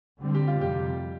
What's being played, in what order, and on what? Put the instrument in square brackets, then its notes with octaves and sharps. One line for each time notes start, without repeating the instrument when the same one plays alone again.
[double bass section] D3 G3 C4
[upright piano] G4
F4
[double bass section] F2 C3 G3 [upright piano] G4